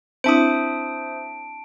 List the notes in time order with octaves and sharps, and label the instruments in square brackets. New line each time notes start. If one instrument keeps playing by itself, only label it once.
[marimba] C4 D4 E4 [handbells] C5 E5 D#6 [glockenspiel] A5 D7